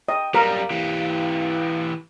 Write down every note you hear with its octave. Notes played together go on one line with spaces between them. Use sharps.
D#5 G5
F#2 G3 A#4 F5
E3 G4